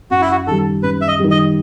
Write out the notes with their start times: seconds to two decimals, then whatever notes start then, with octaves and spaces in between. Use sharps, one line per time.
0.10 F#2 F#4
0.21 E4
0.32 F#4
0.47 D#3 G3 A4
0.83 F#2 B4
1.01 E5
1.08 D#5
1.20 D#3 G3
1.31 D#5